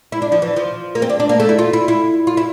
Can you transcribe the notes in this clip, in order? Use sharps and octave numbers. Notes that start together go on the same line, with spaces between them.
E4
D4
F3
E3
F3
A#3
C4
D4
D4
A#3
A3
E4
F4
E4
E4
F4
E4